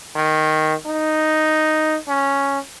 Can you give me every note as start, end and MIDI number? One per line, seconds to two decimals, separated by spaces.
0.16 0.74 51
0.86 1.97 63
2.09 2.59 61